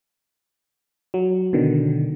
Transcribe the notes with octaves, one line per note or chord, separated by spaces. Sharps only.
F#3
B2 D3 D#3